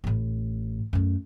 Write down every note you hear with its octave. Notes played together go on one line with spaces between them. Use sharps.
A1 A2
F#2 A3